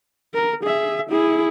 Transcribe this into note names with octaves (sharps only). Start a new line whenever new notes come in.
A#4
G#4 E5
E4 G#4